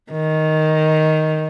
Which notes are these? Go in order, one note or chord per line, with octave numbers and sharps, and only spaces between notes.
D#3